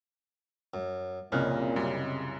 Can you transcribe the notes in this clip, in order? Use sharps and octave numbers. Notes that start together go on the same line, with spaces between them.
F#2
C2 F2 A#2 C#3 C#4 D#5 F6 F#6
F#2 G3